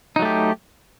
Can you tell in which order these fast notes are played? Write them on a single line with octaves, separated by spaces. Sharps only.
D#4 F#3 A3 G4